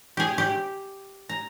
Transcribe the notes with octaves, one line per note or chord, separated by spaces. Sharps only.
G4 G#4
G4 G5
A#5